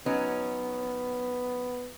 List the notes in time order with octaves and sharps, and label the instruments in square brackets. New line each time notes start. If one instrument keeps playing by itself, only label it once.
[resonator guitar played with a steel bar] F#3 C#4 D#4 [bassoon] B3